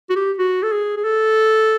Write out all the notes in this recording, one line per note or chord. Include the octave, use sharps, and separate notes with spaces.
F#4
G4
F#4
A4
G#4
G#4
A4